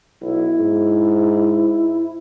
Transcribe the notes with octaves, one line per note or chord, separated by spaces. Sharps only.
B1 E4
G#2